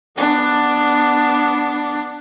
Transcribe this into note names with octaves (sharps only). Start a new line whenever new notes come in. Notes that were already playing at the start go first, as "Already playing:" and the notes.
B3 D4